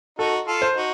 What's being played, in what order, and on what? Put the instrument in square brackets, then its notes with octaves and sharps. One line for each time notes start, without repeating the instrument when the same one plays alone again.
[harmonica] D#4 F#4 [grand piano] A4
[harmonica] F4 A4
[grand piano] C5
[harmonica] D#4 F#4